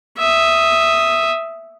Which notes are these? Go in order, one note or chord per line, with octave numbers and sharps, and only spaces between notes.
E5 D#6